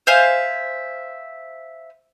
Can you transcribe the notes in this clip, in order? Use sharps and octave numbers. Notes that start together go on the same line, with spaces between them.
C5 E5 F5 G#5